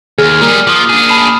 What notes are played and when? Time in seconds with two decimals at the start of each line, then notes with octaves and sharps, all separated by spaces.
0.18 D#2 G#4 F6
0.42 G3 A#3 G#4
0.67 F3 D6 D#6 G7
0.89 D4 G#4
1.09 A5 B5 E7